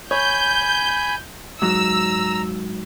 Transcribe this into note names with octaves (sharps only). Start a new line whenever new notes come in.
C#5 G#5 B5 G6
G#2 F#3 A#5 E6